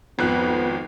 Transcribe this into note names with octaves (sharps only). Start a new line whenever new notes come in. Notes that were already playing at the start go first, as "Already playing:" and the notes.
G#1 F2 B3 F#6